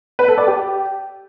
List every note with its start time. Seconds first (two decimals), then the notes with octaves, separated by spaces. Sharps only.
0.19 B4
0.28 A4
0.38 D5
0.47 G4